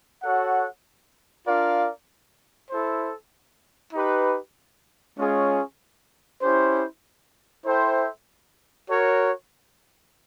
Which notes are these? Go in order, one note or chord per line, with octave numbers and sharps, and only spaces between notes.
F#4 A4 C#5 F#5
D4 F4 A#4 D5 F5
E4 A4 C5
D#4 G4 B4
G#3 C#4 F4 G#4 C#5
C#4 E4 G4 C5
E4 A4 C5 E5 G5
F#4 A#4 C#5